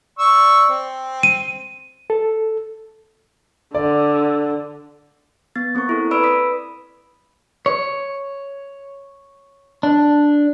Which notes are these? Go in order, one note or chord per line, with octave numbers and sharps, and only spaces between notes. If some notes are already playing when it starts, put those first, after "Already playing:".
D5 C#6 E6
C4
D#7
A4
D3 D5
B3 A6
A#3 C4 A#4 C#6
E4 A4
B4 D5 B5 E6 D7
B4 D#6 B6
C#5
D4